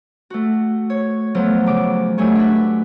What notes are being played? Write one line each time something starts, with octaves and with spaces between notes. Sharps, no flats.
A3 F#4
C#5
F3 F#3 A3 B3
C#3 D6
G2 F#3 A3 G#5 C#6
D4 B4